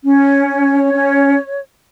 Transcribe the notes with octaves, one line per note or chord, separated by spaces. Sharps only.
C#4
C#5
C#4